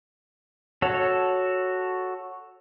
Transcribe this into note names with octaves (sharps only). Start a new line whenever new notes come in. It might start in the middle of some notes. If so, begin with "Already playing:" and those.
F#4 A4 C#5